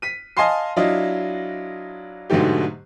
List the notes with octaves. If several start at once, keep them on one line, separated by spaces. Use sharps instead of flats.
B6 D#7
D#5 F5 G#5 A5 C6 C7
F#3 D4 E4 F4 D#5
G#2 B2 D3 F#3 A3 G4